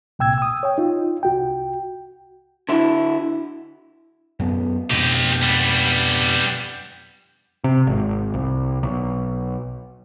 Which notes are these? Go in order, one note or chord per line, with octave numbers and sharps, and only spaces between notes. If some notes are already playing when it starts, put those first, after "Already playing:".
C2 A#2 G5 E6 G#6
D#6 E6
C#5 G5
D#4 F4
C2 F#4 G5
D3 E4 F#4
F#2 B3
F2 B2 G4 D#5
G3 B3
C3
G#1
C2
B1